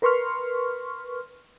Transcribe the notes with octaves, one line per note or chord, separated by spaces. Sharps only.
A#4 B4 C6 C#6 F6